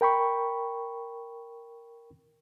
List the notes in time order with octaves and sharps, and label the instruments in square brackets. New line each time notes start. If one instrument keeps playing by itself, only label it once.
[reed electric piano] A#4 G5 B5 C#6